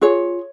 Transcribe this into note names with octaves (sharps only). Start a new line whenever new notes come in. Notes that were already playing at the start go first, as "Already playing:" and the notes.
F4 G#4 C#5